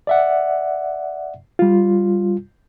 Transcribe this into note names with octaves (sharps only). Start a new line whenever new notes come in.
D5 E5 F#5
G3 F4